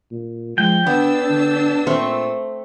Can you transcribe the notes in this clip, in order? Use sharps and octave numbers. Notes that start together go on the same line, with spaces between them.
A#2
F3 G#3 G5
D3 B3 D4 A5 E6
D3
A#2 A3 C4 C#6